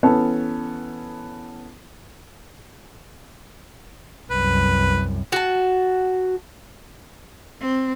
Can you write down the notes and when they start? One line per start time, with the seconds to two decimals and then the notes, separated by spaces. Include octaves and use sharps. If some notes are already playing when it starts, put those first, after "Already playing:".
0.03 E3 B3 C#4 A4
4.31 C2 F#2 B4
5.32 F#4 A5
7.61 C4